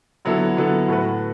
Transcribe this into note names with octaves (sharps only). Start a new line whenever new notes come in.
D3 F#3 B3 E4 A4
D3 F#3 B3 E4 A4
A2 A3 F#4 B4